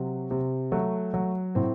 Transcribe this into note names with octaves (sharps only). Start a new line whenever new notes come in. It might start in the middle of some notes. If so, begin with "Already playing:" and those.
Already playing: C3 F#3
C3
F#3 A3
F#3
A2 C4